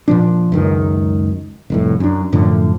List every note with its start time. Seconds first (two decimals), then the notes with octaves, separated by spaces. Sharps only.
0.08 A#2 F3 D4
0.52 C#2 F#2 D#3
1.70 F1 C2 A2
2.00 F#2 D4
2.32 F#2 A2 D3 F3